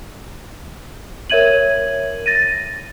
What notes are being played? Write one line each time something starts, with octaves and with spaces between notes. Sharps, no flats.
A#4 C#5 E5 G#6 D#7 F#7
A6 A#6 D#7